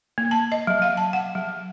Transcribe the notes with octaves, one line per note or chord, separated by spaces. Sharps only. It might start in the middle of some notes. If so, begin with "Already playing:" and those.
A#3
A5
D#5
F#3
F5
A5
F#5
F#3